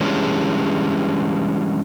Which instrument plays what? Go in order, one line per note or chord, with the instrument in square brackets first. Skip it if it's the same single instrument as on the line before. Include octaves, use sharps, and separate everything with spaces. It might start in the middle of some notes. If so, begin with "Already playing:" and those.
[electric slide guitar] E3 G3 G#3 C#4 D4